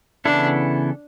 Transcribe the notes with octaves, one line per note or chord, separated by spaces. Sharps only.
C#3 E3 B3 D4 E4 A4